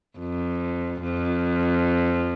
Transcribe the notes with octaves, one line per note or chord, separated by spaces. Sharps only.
F2
F2